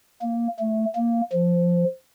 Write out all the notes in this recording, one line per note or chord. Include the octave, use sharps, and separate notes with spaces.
A#3
A3
A#3
F3